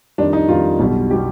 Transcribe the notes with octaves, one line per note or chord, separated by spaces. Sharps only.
F2 D#3 G3 D4
D#4
F2 D#3 G3 F4
B1 B2 G3
B2 G3 G4